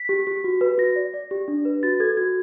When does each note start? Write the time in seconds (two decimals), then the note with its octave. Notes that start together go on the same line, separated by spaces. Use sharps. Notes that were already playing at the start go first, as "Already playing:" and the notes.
Already playing: B6
0.09 G4
0.27 G4
0.44 F#4
0.61 B4
0.78 F#4 A#6
0.96 D5
1.14 D5
1.31 G4
1.48 D4
1.65 B4
1.83 F#4 A6
2.00 A4 G#6
2.17 F#4 G#6